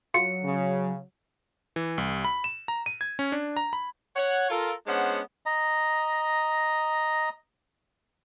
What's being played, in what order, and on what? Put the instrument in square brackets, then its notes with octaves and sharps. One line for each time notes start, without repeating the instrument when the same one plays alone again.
[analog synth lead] F#3 [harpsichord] F4 [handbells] C#7
[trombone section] C#3
[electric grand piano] E3
C2
B5
E7
A#5
D#7
G#6
C#4
D4
A#5
B5
[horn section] C#5 F#5
F4 A4 A#4
G#3 B3 C#4 D4 C5 F#5
[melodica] D#5 A#5